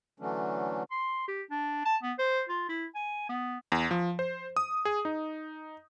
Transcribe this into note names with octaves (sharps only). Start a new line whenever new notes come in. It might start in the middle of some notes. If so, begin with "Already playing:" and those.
D3 E3 F#3 A3 C#4 D4
C6
G4
D4
A5
B3
C5
F4
E4
G#5
B3
E2
F3
C5
D#6
G#4
D#4